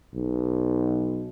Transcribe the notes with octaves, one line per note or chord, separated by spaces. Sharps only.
B1